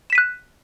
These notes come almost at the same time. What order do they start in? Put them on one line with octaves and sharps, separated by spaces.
E7 B6 D#7 F#6